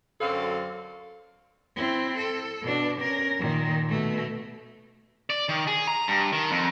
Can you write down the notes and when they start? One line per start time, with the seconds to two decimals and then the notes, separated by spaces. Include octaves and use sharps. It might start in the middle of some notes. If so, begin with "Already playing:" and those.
0.21 F#2 D3 F#3 C4 A4 F5
1.76 C4 E4
2.18 A4
2.62 B2 D4
3.01 C#4 A#4
3.39 A#2 D#3
3.89 B2 A3
5.30 D5
5.49 D#3
5.67 G#4
5.88 A#5
6.08 G2
6.32 D#3
6.51 F2